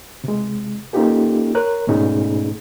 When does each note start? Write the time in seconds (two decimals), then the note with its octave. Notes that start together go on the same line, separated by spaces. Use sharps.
0.24 C3 G#3
0.93 A#3 C#4 D#4 F4 G4 A4
1.55 A#4 C#5 F#6
1.87 G#2 B2 A3 C#4 D#4 G#4